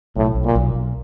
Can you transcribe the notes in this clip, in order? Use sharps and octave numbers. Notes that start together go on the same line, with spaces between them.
B1 A2
B1
A#2
B1
B1